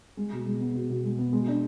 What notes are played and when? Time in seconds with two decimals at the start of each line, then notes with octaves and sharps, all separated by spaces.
0.17 G#3
0.32 B2
0.46 G#3
0.60 B3
0.75 B2
0.90 B2
1.04 G#3
1.19 B3
1.33 G#3
1.48 D4